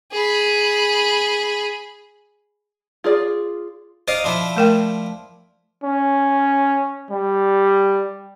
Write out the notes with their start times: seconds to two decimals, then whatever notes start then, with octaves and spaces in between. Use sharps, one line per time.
0.12 G#4 B5
3.04 F4 G#4 D5
4.08 D#4 C5 D5 F5
4.24 F3 D4 E4
4.56 A3 A#4 G5
5.84 C#4
7.11 G3